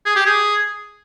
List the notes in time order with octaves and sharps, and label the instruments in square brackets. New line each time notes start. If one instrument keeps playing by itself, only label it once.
[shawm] G#4
G4
G#4